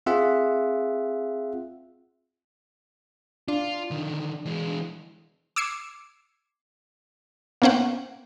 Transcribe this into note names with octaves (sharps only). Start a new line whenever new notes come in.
C4 F4 G#4 E5 F#5
D4 F4
D3 D#3
E3 G#3
D6 E6 G#6 C7 C#7
A#3 B3 C#4 C5 F#5 G5